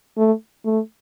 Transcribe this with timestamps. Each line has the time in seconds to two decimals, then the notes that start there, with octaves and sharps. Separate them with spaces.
0.18 A3
0.65 A3